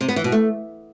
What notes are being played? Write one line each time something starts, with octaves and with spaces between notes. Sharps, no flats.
C3
B3
E3
B2
A3